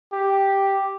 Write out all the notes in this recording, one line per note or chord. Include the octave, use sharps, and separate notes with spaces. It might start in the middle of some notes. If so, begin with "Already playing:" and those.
G4